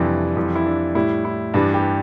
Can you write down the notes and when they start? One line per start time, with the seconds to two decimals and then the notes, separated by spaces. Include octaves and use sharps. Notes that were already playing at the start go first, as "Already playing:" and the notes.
Already playing: F2 C3 E3 G3 D4
0.37 F2 E3 G3
0.56 E4
0.66 D4
0.95 A2 G3 E4
1.25 E4
1.54 G2 E3 G3 D4
1.74 G4